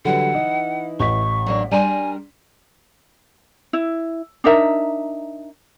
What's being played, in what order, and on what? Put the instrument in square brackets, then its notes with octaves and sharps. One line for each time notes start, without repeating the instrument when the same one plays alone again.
[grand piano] D3 F#3 G3 [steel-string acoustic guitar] E3 E4 [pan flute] F#5
[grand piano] D#4
[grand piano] A1 D#5 B6 [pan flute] C#6
[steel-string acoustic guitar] F#3 A#3 D4
[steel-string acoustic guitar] G3 D4 A#4 [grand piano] D5 A#5 C6 [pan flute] G#5
[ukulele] E4
D4 D#4 A#4 E5